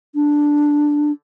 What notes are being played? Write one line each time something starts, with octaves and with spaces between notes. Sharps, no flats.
D4